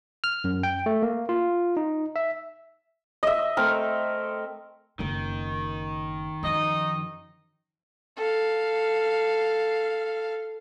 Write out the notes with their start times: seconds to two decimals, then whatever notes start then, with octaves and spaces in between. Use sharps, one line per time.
0.24 F6
0.44 F#2
0.63 G5
0.86 A3
1.03 A#3
1.29 F4
1.77 D#4
2.16 E5
3.23 D#5 E5
3.57 A3 C4 A#4
4.99 F#1 D#3 C4
6.43 F#2 F3 D#4 D#5
8.16 A4 F5